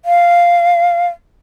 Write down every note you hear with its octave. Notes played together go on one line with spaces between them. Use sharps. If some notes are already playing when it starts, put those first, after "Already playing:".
F5